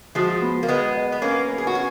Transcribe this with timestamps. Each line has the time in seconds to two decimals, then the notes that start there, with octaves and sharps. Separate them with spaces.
0.15 F3 G#3 F#4
0.42 B3
0.63 A#3
0.68 G#3 B3 D#5
0.95 D#5
1.12 B3
1.22 A#3 C#4 B4
1.49 B4
1.58 G#4
1.67 F#4
1.75 C#4